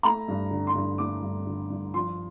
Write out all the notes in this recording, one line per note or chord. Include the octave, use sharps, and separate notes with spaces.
A3 A#5
G2
D3
C6
G2
A3 D6
G2
D3
G2
F3 C6